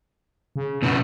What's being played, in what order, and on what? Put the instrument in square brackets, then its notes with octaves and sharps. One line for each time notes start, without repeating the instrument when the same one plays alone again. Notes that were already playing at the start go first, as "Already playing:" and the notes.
[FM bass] C#3
[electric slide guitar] B2 C#4 E4 [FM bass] B3